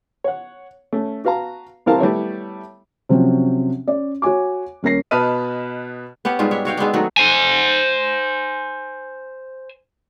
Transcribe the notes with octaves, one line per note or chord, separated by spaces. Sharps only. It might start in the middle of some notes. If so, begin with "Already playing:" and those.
C#5 F#5
A3 C#4
F#4 B4 F5 A5 A#5
C2 E3 C4 A#4 F5 A5
G3 A3 B3 E4 C#5 E5
C3 F3 F#3 C4 C#4
C#4 D5
F#4 C#5 G#5 D6
D#1 C#4 A#4 A#6 C7
B2 B4 D#5 A5 F6 D#7
B3 C#4 G4 F#5
G#2 G3 G#3 F4
D4 C#5 E5
F#4 C#5 F5 G5
G#3 B3 C4 D4
D#3 F#3 A3 F#4
C5 G#5